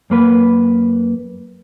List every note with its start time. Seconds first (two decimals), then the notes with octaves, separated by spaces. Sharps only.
0.10 F#2 A#3 B4